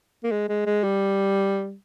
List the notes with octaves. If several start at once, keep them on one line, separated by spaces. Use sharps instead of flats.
A#3
G#3
G#3
G#3
G3